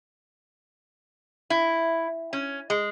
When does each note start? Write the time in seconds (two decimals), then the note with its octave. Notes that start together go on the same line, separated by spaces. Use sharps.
1.50 E4
2.33 C#4
2.70 G#3